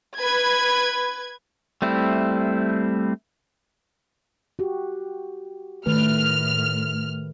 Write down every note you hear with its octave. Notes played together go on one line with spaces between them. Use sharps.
B4 G#6
G3 A3 C4 E4
F#4 G4
A2 D#3 A3 B4 F6